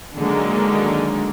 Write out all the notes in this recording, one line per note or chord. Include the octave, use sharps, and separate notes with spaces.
D3 D#3 F#3 G#3 A#3 D#4